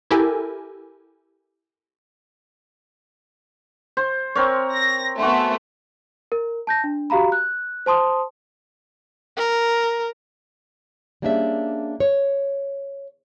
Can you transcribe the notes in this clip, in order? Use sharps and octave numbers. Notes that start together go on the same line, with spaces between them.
E4 G4 A4 A#4 G#5
C5
C4 A#4 C#5
A#6
A3 B3 F#4 G#5 C6
A#4
A5 G6 A#6
D4
F#4 G4 F5 A#5 B5
F#6
C5 A5 C6 D#6
A#4
G3 A#3 C#4 D4 G#4 E5
C#5